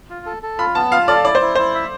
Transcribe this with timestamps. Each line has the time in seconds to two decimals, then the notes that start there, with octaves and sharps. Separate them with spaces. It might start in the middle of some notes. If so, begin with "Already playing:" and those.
0.10 F4
0.26 A4
0.43 A4
0.59 F4 B5
0.75 B3 A5
0.92 F4 F5
1.08 A4 D5
1.25 E4 D5
1.35 C5
1.41 E4
1.55 E4 C5
1.75 E5